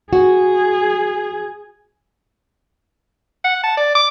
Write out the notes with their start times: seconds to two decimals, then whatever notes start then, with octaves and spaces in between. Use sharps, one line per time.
0.13 F#4 G#4
3.44 F#5
3.63 A5
3.77 D5
3.95 D6